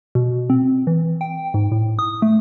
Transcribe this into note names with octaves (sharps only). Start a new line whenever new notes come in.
B2
C4
E3
G5
G#2
A2
D#6
A3